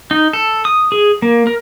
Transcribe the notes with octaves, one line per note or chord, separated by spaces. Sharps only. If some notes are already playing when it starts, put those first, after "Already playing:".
D#4
A4
D#6
G#4
A#3
A#4